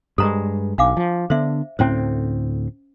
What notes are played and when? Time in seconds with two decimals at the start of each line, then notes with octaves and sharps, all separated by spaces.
0.18 G2 G#3 A4 C5 A#5
0.78 B1 D4 F5 D6
0.97 F3
1.30 D3 B3 D4 C5 E5
1.79 D2 A2 C4 C#4 C5